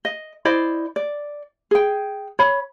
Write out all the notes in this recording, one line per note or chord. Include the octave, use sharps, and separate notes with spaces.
D#5
E4 C5 D5 D#5
D5
G#4 G5
C#5 B5